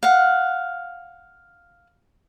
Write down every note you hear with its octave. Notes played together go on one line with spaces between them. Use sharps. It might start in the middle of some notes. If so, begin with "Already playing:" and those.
F5 F#5